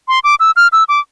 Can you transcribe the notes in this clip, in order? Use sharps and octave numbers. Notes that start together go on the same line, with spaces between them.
C6
D6
E6
F6
E6
D6